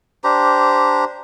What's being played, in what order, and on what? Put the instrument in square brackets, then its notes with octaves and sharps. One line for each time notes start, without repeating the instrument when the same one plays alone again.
[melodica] D4 G4 C5 A#5